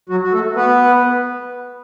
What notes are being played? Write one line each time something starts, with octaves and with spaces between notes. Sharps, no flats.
F#3 F#4
F#4
A3 A4
B3 B4